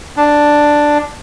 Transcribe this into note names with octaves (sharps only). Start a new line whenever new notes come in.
D4